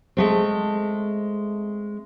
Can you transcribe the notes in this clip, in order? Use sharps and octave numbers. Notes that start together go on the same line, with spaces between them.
G#3 A3 C4